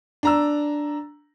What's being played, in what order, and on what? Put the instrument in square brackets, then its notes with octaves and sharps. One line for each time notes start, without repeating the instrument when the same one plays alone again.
[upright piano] D4 A#5 E6